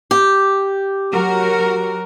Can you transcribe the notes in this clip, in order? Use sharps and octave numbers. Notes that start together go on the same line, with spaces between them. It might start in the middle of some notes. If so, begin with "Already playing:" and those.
G4
F#3 F#4 A#4